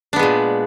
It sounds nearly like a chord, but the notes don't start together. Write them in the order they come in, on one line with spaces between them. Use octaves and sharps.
D4 B3 G#3 A#2